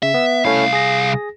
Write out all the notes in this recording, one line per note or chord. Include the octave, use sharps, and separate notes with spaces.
C#3 E5
B3
C2 A3 C#4 E4 F5
G#4 A#6